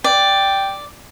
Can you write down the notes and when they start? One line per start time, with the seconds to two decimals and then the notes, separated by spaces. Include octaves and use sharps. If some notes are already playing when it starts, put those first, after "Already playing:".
0.04 D5 G5